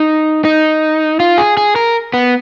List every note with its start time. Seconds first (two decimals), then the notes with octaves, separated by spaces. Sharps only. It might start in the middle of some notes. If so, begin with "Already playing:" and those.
Already playing: D#4
0.45 D#4
1.20 F4
1.38 G#4
1.57 G#4
1.76 A#4
2.14 B3